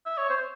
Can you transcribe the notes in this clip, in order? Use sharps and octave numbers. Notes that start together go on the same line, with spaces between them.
E5
C#5
C5